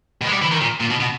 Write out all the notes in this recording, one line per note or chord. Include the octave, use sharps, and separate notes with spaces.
B2
G#3
G3
E3
D#3
A#2
A#2
B2
B2